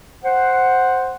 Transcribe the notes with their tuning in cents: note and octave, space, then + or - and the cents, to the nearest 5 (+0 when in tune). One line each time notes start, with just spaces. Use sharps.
C5 +0 F#5 +0